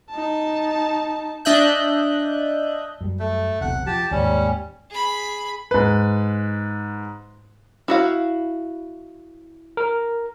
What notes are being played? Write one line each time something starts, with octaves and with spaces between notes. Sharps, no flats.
D#4 A5
D4 D#5 E5 F#6 G6
F#2 G3
A3
E1 B1 C3 F#5
F3 G4 A5
D#2 G#2 G3 C#4
G#4 B5
G#2 B4
E4 F#4 F5
A#4